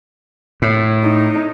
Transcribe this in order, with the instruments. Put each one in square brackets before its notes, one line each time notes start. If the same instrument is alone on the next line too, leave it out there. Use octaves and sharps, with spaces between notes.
[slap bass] A2
[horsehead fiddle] D#4